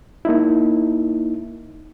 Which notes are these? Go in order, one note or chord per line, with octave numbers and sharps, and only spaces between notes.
A#3 D#4 E4